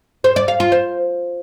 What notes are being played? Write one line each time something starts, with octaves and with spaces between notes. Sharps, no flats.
C5
D5
F5
F4
C5